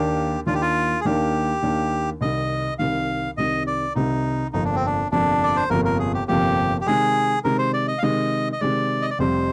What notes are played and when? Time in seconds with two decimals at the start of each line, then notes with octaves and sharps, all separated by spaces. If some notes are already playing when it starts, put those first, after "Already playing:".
Already playing: D#2 D#3 A#3 D4 G4
0.46 D#2 D#3 A#3 D4 F4
0.54 G4
0.62 F4
1.01 G#4
1.05 D#2 D#3 A#3 D4 G4
1.63 D#2 D#3 A#3 D4
2.21 C2 C3 D#3 D#5
2.79 C2 C3 D#3 F5
3.37 C2 C3 D#3 D#5
3.67 D5
3.95 C2 C3 D#3 D#4
4.53 G1 F2 C3 F3 A#3 D#4
4.65 D4
4.75 C4
4.86 D4
5.12 G1 F2 C3 F3 A#3 D4
5.43 D5
5.56 C5
5.70 G1 F2 C3 F3 A#3 A#4
5.85 A#4
5.99 G#4
6.14 G4
6.28 G1 F2 C3 F3 A#3 G4
6.81 G4
6.86 C3 D#3 G#3 G#4
7.44 C3 D#3 G#3 A#4
7.59 C5
7.73 D5
7.87 D#5
7.98 F5
8.03 C3 D#3 G#3 D#5
8.52 D#5
8.60 C3 D#3 G#3 D5
9.02 D#5
9.10 D5
9.19 F1 F2 C3 G3 C5